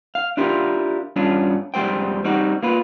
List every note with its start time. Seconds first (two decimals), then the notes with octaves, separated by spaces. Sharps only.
0.15 F5
0.37 D4 E4 F4 G4 A#4
1.16 G2 C#4 D4 F4
1.74 F2 G3 G#3 C5 G5
2.24 G3 C4 D#4 F#4
2.63 A#3 F4 B4